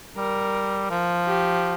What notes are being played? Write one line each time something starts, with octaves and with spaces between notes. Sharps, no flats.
G3 A#4
F3
G4